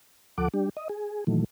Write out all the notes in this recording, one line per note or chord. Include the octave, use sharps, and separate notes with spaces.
D2 F3 A4 F#5 D6
G3 D4 G4
D#5
G#4
A#2 D#3 E3 F#3 A3